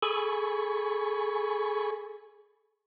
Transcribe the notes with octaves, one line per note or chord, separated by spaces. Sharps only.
G#4 A4 G#5 B5 C#6